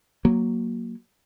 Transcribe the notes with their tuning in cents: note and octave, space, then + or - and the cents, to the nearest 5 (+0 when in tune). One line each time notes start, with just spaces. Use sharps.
F#3 +0 A#3 +0